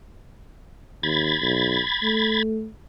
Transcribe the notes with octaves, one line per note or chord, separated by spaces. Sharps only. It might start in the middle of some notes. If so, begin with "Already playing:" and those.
D#2 B5 G#6 A6
B1
A3